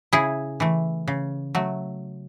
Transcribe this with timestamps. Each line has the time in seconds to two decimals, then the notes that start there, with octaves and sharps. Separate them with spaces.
0.13 C#3 E4 G#4
0.60 E3 A3
1.08 C#3
1.55 F#3 A3